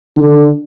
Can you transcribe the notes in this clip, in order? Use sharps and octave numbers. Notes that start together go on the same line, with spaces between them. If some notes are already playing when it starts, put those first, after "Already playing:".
D3